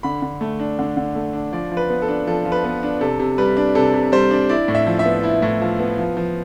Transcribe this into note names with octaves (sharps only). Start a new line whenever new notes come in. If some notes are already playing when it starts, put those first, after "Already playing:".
D3 B5
D3
A3
D4
D3
D3
A3
D4
F3 D5
F3
B4
B3
A4
D4
F3 A4
F3
B4
B3
D4
C3 A4
C3
G3 B4
D4
C3 A4
C3
G3 C5
D4
E4 D5
A2
E5
F3
E5
B3
E4
A2
F3
B3
F3
F3